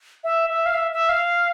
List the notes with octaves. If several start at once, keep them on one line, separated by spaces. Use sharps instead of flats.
E5
E5
F5
E5
E5
F5